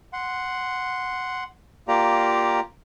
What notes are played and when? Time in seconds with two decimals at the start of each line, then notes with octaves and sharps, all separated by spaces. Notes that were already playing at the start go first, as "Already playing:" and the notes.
0.13 F#5 C6
1.88 A#3 F4 G4 D5 A#5